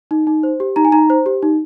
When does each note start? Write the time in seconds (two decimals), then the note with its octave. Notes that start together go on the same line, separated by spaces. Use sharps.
0.11 D#4
0.27 D#4
0.43 C5
0.60 G4
0.76 D#4 A#5
0.85 G#5
0.92 D#4 A#5
1.10 C5
1.26 G4
1.42 D#4